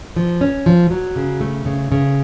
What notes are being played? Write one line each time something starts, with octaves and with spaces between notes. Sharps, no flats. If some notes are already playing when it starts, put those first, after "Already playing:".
F3
C#4
F3
F#3
C#3
A3
C#3
C#3